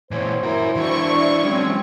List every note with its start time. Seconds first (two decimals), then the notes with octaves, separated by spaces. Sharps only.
0.11 A#2 E3 C5 C#5
0.43 E4 F#4 A#4
0.76 E3 D4 F#4 C#6
1.45 F#3 G#3 C4 C#4